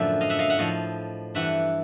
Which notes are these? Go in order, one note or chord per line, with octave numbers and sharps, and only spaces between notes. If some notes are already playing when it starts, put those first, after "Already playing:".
Already playing: F#2 A2 D3 F3 A#4 D5 E5
D#5 F5
E5 F#5
D#5 F5
E5 F#5
A2 F3 D#5 F5
G2 E3 E5 F#5